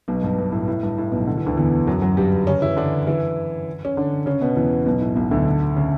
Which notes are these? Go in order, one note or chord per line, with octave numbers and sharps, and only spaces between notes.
B1 B2
G2
G2
A2
A2
G2
A2
B1 B2
D3
E3
D2 D3
E2 E3
F#2 F#3
F#2 F#3
G2 G3
C#3 C#4
E3 E4
D3 D4
E3 E4
C#4
D3 D4
C#3 C#4
B2 B3
E2 E3
B1 B2
A2
B1 B2
D2 D3
C#3